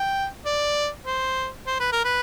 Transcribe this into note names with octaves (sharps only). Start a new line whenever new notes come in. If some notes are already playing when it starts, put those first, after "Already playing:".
Already playing: G5
D5
C5
C5
B4
A#4
B4